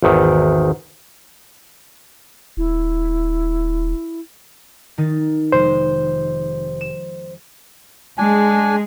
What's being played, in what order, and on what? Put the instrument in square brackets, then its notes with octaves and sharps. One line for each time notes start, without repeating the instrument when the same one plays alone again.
[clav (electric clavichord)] G#1 E2 D#3
[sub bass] D#1 [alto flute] E4
[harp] D#3 D#4 A6
[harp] F1 G#3 [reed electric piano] C5
[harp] E7
[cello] G#3 G#4 [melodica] D4 G#5